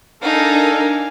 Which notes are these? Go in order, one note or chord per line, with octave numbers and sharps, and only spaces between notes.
D4 D#4 A4 A#4 F5 G#5